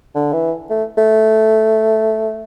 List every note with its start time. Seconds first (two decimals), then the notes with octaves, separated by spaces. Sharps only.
0.15 D3
0.33 E3
0.70 A3
0.97 A3